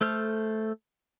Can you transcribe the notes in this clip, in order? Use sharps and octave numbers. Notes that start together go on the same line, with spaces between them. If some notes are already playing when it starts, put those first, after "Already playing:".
A3 A4 C5 F6